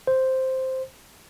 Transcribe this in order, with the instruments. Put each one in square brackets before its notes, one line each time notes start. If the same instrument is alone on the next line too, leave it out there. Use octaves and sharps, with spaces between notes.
[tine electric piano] C5